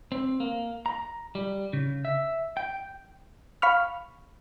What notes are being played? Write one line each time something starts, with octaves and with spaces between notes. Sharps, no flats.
C4
A#3
A#5
G3
C#3
E5
G5
F5 B5 C#6 F6